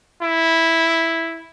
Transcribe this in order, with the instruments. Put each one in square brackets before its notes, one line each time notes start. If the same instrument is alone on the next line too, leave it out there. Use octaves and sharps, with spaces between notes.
[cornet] E4